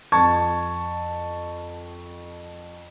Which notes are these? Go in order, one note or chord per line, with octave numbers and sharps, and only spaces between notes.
F2 A5 C#6 G#6